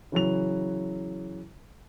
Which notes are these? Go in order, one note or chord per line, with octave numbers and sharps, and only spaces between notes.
C#3 E3 F#3 F7